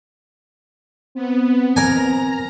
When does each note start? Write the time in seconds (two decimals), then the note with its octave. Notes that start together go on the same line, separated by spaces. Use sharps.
1.15 B3 C4
1.76 A#4 G#5 A#5